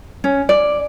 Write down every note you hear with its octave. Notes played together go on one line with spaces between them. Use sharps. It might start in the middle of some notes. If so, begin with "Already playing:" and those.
C#4
D5